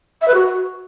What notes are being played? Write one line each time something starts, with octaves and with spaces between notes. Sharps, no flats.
E5
B4
F#4